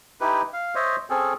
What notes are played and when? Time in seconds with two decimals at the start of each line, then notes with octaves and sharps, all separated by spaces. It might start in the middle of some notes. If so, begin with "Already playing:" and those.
0.21 D#4 E4 G4 B4
0.53 F5
0.75 C5 C#5 D#5 E5
1.10 C4 C#4 G#4 A4